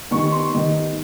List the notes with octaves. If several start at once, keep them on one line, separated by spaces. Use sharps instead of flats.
D#3 G3 B3 D#4 C#6
C6
D#3 G3 B3 D#4